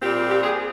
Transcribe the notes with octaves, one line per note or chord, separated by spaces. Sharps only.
A#2 G3 C4 F4 G4
G4
G#4